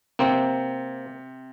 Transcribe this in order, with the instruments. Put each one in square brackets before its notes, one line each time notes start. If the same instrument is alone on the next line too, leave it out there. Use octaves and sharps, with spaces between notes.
[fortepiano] C3 [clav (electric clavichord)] A#3 C4